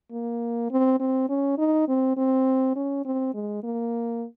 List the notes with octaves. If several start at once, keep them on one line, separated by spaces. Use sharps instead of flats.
A#3
C4
C4
C#4
D#4
C4
C4
C#4
C4
G#3
A#3